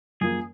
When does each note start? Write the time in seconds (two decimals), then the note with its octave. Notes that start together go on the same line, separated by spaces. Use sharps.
0.21 F#2 F3 A#3 G#4